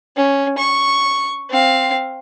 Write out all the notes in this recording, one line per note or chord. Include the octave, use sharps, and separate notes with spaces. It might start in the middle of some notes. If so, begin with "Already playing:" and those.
C#4
C#6
C4 F5